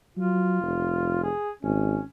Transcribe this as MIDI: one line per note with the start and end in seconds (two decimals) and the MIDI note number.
0.17 0.58 54
0.17 1.20 65
0.62 1.29 29
1.24 1.50 68
1.63 1.98 32
1.63 2.03 61